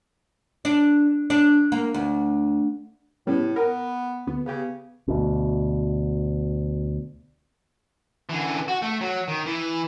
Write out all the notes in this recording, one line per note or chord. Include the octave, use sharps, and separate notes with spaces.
D4
D4
A#3
D2
A2 C#3 G3 B3
B3 A#4
D2 B3
C#3 B3 G4
D2 B2
D3 E3
F#4
A3
F#3
D#3
E3